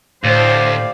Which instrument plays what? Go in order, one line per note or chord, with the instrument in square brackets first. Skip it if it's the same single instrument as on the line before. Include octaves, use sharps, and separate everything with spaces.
[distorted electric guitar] D2 [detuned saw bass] A2 [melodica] G4 D5 F5 [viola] C5